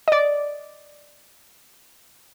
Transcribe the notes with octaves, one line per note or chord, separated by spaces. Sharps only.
D5 D#5